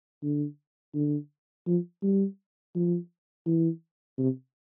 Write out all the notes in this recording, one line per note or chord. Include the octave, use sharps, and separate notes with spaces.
D3
D3
F3
G3
F3
E3
C3